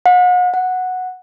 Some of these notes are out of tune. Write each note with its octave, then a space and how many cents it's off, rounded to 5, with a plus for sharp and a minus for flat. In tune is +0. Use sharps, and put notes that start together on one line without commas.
F#5 -40
F#5 -5